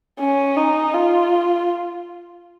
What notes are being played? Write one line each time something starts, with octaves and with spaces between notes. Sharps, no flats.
C#4
D#4
F4